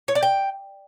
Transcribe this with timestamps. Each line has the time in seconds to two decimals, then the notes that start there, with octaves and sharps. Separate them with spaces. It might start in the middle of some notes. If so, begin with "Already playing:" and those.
0.08 C#5
0.15 D5
0.23 G5